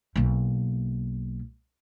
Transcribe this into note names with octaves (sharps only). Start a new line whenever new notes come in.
B1 A#3